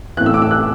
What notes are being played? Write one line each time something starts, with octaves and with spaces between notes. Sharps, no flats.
A2 E3 F#6
E6
D6
E6
F#6